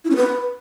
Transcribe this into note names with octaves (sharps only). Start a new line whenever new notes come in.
E4
C#4
B4